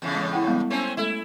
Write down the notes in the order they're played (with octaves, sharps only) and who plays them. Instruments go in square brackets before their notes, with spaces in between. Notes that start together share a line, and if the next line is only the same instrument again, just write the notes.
[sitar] E2 A2 C#3
[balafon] G#3
E4 F#5 G5
G3 G#3 B3
[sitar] A3 C4 C#4
[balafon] G#3 A3 A4 [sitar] E4